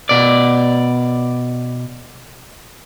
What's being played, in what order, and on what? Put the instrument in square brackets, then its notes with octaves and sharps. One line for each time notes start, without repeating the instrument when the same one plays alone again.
[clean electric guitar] B2 D5